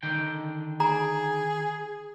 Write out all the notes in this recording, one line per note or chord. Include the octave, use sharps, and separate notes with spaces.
D3 D#3 G5
G#4 G#5 A#5